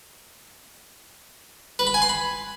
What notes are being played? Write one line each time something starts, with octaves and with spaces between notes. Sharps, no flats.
B4
B5
G#5
C6
B5